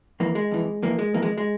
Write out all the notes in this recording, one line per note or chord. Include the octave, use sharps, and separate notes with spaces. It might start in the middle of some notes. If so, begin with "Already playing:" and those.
F2 E3 A#3
G#3
F2 E3
F2 E3 A#3
G#3
F2 E3 A#3
G#3
G#3